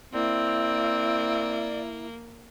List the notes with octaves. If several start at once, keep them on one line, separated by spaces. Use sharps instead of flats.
A#3 C4 E4 D5